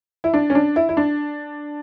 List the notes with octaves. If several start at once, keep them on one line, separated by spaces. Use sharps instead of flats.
E4
D4
C#4
D4
E4
E4
D4